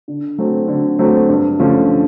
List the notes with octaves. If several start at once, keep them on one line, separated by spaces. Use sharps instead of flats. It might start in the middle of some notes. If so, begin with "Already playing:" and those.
D3
F#3 A3 C4
D3
F#3 A3 C4
G2
D3 F3 A3 C#4